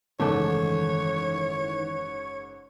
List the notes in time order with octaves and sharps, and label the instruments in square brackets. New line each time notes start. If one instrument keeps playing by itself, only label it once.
[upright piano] F#1 G#2 D6 [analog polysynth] D#3 E3 [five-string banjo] A3 A4 [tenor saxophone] C#5